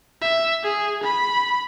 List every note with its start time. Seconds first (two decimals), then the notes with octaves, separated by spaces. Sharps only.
0.22 E5
0.64 G#4
1.03 B5